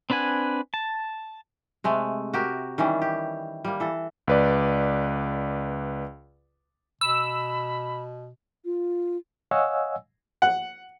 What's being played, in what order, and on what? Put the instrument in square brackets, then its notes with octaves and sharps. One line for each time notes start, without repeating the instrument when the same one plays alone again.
[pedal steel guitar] C4 D4 B4 F#5 G#5
A5
[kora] C3 G#3 A3
F#4 G4 A#4
D#3 E3 G3 C#4
G4
G3 A#3
E3 A4
[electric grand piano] C#2 B4 D5
[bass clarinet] B2 [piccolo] B5 [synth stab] E6
[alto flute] F4
[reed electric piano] C#5 D#5 F5 F#5 G#5 E6
[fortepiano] F#5